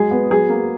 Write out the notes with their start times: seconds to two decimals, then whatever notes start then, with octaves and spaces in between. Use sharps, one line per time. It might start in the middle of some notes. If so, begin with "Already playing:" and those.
Already playing: F#3 G#3 G#4
0.11 B3
0.30 F#3 G#4
0.49 A#3